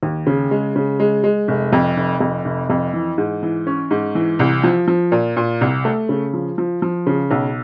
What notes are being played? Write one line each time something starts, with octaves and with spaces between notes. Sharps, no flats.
D#2
C#3
G#3
C#3
G#3
G#3
F1
F2
F1
F2
F1
F2
E3
G#2
E3
C#4
G#2
E3
C2
F3
F3
A#2
A#2
C2
A3
C#3
F3
F3
F3
C#3
B1